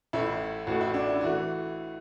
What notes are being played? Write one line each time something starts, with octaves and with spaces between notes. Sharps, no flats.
A1 A2 A3 E4
A1 A2 A3 F#4
E4
D4
E4
E3 A3 F#4